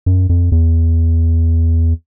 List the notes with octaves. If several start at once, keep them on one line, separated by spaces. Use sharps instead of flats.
F#2
F2
E2